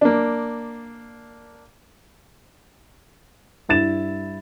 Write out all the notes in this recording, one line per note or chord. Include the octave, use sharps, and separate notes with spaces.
A#3 D4
G2 E4 A6 E7